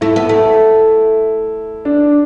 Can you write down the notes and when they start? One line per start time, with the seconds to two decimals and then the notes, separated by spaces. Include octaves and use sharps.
0.01 A3 E4
0.16 B3
0.29 A3
1.85 D4